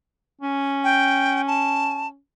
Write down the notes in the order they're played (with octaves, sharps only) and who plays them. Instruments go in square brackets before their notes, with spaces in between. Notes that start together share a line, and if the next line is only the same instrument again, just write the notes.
[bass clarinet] C#4
[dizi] G5
A5